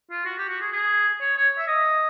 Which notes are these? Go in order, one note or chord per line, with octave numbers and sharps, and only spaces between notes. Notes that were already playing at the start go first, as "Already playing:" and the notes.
F4
F#4
G4
F#4
G#4
G#4
C#5
C#5
E5
D#5